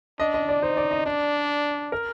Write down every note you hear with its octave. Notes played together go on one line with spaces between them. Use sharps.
D4 D#5
D#5
D5
D#4 C5
D5
D#5
D4 D5
A#4